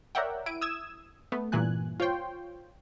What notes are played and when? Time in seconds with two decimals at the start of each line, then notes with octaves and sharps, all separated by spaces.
0.15 A#4 C#5 D5 E5 F#5 G5
0.46 E4 D7 D#7
0.61 D#6 E6 G#6 E7
1.32 A3 B3
1.52 G2 A#2 E3 G#5 F#6
2.00 F4 C5 C#5 G5 C6